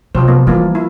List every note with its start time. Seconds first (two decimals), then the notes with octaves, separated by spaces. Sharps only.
0.15 C3 F3 F#3 C5
0.28 F#3 A#3 B3
0.47 E3 F3 G3 A#3 E4
0.75 E4